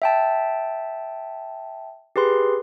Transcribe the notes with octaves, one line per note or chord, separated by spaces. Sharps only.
E5 G5 A5
G4 G#4 B4 C6